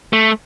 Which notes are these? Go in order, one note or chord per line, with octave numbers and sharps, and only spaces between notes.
A3